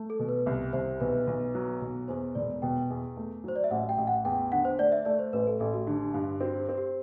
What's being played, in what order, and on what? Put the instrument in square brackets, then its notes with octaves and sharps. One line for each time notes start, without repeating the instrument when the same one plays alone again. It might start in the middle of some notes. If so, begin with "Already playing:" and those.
Already playing: [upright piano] A3
[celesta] A4
[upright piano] B2
[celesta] B4
[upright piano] C2
[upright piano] C2 [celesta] C5
[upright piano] B1 [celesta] B4
[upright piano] B1
F#3
B1
[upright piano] E2 [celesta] C5
[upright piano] E1 [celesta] D5
[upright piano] B2 [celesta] G5
[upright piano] E2
A3
[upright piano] F#3 [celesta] C5
[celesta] D5
E5
[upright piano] A1 [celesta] F#5
[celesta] G5
[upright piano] A1
[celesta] F#5
[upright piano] E2 [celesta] G5
[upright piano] D3 [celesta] F#5
[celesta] C5
[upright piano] A3 [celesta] D5
[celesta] E5
[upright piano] A3 [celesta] D5
[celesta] C5
[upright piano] A1 [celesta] B4
[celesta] A4
[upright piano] A1 [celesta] A4
[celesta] F#4
[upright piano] D3 [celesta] G4
[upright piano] G2
[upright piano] C4 [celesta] F#4
[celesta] G4
[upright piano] C4
[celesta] G4